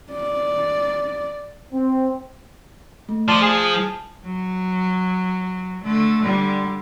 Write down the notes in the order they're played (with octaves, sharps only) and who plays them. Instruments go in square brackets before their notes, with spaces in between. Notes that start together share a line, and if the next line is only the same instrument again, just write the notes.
[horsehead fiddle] D5
[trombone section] C4
[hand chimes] A3
[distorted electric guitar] F3 [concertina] D5 C6 [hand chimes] A5
[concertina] G#4
[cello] F#3
D3 A3
D3 G3